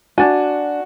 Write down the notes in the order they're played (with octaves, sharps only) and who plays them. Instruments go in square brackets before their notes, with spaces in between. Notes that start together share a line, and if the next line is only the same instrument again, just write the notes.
[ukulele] D4 G#5 [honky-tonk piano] F#4